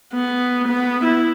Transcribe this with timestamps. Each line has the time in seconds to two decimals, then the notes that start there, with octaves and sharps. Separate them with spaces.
0.13 B3
0.67 B3
1.04 E4